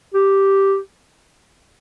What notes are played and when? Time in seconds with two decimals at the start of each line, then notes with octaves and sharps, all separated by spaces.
0.14 G4